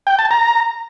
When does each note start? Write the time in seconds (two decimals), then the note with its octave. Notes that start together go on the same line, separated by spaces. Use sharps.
0.07 G5
0.19 A5
0.31 A#5